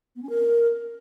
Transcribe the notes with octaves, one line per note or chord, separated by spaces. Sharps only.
B3
C#4
A#4